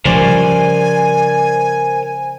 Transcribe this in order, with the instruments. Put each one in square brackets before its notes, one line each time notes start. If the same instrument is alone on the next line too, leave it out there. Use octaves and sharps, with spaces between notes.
[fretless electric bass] C#3 F3 G3 [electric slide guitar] A#4 C5 D5 [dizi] G#5